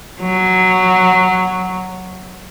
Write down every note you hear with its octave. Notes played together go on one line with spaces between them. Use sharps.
F#3